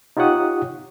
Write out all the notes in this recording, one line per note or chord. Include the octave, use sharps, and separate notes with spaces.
D#4 F4 G4 C#5 F#5 D#6